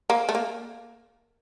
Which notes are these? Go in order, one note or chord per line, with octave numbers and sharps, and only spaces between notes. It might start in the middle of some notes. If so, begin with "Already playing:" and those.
A#3
A3
A#3